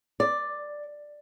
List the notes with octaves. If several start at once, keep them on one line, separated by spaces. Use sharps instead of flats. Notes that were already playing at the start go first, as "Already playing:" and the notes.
D5